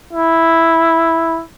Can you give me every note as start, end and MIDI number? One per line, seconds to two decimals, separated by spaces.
0.13 1.43 64